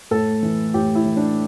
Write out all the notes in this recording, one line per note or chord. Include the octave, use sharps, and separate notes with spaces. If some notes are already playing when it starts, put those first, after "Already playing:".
A2 A4
E3
A2 G4
E4
E3
D4